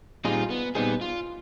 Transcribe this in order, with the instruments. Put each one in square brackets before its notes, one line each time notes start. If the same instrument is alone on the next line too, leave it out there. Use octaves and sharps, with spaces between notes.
[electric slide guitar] A#2 G3 C4 D#4 G#4 [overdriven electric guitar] F4
[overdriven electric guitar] B3
[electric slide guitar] A#2 G3 C4 D#4 G#4 [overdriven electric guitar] B3
[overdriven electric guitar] F4